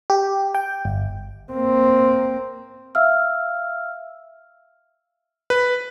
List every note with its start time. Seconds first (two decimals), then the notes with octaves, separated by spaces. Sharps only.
0.10 G4
0.54 G5
0.85 G1
1.52 A#3 C4
2.95 E5 F5 E6 F6
5.50 B4